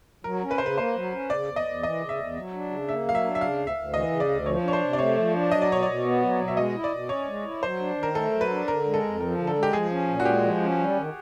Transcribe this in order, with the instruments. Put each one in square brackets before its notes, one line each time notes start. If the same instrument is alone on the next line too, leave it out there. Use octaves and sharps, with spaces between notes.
[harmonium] F#3 [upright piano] A#4
[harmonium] C#4
[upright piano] B4
[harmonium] C#3 [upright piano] C5
[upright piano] B4
[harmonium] A#3 [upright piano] C5
[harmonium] F#3
C#4
[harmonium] C#3 [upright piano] D5
[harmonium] E2
[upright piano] D#5
[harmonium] E2
[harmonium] E3 [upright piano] D#5
[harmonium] C#3
[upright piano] E5
[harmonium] E2
F#3
D4
C#3
[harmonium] A#3 [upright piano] E5
[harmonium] F#3 [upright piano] F5
[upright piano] E5
[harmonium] D4
[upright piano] E5
[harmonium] C#3 [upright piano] F5
[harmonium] D2
[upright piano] E5
[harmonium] D2
[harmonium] E3 [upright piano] D#5
[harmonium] C#3
[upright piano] D5
[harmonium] D2
[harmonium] F3 [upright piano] C#5
[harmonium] D4 [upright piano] C#5
[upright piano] C5
[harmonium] C3
[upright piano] D5
[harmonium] A3 [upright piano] C#5
[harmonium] F3
D4
[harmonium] F#3 [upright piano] D#5
[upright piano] D5
[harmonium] B2 [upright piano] C#5
[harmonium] B2 [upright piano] D5
[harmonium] B3
F#3
B2
[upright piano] E5
[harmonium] G#3 [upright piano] D#5
[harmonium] E4
[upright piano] D5
[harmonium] B2
[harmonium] C#4 [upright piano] C#5
[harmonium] G#3
E4
[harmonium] F#3 [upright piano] C5
[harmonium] D4
D#3
[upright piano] A#4
[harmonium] A3 [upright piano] A4
[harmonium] F#3
[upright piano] B4
[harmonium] D4
[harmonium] D3 [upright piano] A#4
[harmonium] G#3
[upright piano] A4
[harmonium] F2
[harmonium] F3 [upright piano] A#4
[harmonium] D3
[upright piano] A4
[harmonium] G#3
[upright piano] G4
[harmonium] F3 [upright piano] G#4
[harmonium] C#4
A#2
[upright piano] F#4
[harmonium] G#3 [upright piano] G4
[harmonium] F3
C#4
G3
D#3